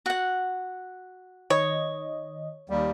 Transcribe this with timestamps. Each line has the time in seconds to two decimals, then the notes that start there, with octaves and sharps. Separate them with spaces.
0.06 F#4 F#5
1.50 D#3 C#5 D#5
2.70 D#2 G3